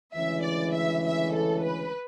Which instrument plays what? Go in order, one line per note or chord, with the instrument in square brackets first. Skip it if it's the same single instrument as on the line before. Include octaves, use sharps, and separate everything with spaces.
[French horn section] D2 C#3 E3 G#3 C#4 [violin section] E5
[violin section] D5
E5
E5
A4
B4